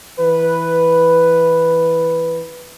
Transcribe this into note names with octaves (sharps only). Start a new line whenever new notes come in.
E3 B4